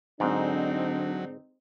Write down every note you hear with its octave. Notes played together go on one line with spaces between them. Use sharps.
G#2 D3 F#3 C4 D4 D#4